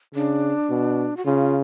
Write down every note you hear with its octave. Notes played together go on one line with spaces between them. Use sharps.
C#3 D4
B2
F#4
C#3 F4